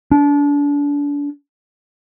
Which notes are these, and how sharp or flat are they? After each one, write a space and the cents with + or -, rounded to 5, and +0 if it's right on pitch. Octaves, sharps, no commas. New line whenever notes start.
D4 -30